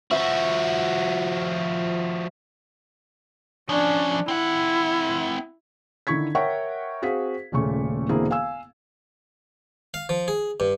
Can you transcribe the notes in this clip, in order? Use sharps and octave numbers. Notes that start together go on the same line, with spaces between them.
F3 F#4 E5
F3 C#4 D4
C4 E4 F#5
D3 D#3 E4 C#6 G#6 B6
A#4 C#5 E5 F#5 G5 C#6
C4 F#4 G#4 F5 B6
D#1 A#2 C#3 A3 C#6
E1 D3 A#3 C4 E4 G#4
F5 G#5 E6
F5
F3
G#4
G2